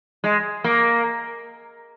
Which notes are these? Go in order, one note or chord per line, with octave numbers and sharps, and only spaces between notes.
G#3
A#3